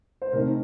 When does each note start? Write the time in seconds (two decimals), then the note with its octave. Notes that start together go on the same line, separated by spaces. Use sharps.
0.22 C5
0.32 C3 D#3 A3 C4 D#4 A#4